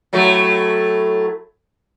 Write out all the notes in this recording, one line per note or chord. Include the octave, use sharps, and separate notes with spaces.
A2 F#3 A3